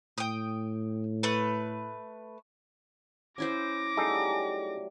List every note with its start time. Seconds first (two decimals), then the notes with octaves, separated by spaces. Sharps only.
0.18 A2 G5 D#6
1.23 A3 B4
3.38 C#4 E4 C5 D6 A#6
3.97 F#3 G3 A3 D#4 G#4 A4